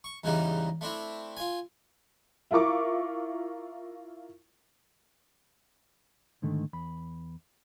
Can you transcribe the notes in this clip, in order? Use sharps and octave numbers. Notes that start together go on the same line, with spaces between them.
C#6
E2 G#2 C#3 E3 G3 D#4
A3 C4 D4 E4
F4 G#5
E4 F4 A#4 C#6 D6
G#2 D3 D#3 A3
E2 B5